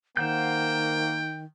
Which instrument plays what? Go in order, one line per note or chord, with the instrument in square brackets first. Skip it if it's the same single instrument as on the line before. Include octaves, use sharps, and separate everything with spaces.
[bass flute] D#3 [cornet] A#3 [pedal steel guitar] C5 F#5 G6 [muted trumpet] G5